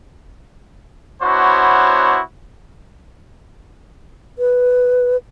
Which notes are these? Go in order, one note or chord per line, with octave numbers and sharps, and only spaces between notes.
B3 D4 E4 F#4 C5 C#5
B4